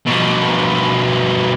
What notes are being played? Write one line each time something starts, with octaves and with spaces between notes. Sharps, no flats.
B2 F3